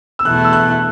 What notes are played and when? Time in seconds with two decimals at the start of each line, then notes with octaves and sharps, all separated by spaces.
0.19 E6
0.25 E2 B2 A3 E4 F#6
0.45 E6
0.53 F#6